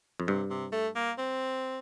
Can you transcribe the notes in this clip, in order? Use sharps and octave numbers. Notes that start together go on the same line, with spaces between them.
F2
G2 C3
C3
A3
A#3
C4